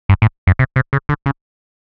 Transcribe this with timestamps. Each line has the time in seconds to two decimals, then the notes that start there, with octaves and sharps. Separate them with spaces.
0.09 G2
0.22 A2
0.47 F#2
0.59 C3
0.76 C3
0.93 C#3
1.09 D3
1.26 C#3